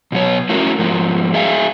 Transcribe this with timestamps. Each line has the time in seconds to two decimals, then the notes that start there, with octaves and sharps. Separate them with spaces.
0.12 B2 F#3 C#5
0.49 A3 C#4 E4 F#4 A#4
0.78 G#2 F3 A#4
1.34 G#4 E5 F5 G#5